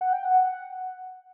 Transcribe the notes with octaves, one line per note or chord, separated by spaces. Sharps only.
F#5
G5
F#5